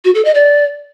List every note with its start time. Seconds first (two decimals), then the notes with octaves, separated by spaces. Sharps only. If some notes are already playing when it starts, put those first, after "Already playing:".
0.05 F#4
0.15 A4
0.25 D#5
0.35 D5